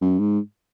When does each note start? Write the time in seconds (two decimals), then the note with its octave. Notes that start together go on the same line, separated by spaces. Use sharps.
0.01 F#2
0.20 G#2